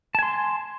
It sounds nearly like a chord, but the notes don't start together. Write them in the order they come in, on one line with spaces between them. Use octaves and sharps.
A5 G#5 C6